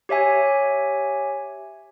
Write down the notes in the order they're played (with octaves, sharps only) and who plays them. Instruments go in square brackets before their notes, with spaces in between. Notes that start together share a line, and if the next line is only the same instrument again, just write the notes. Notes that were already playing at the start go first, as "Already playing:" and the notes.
[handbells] G4 C#5 E5 G#5